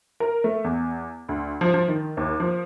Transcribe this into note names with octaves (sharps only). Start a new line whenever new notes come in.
A#4
A3
E2
D2
F3
F3
D#3
D#2
F3